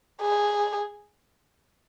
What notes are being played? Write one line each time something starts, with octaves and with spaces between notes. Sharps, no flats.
G#4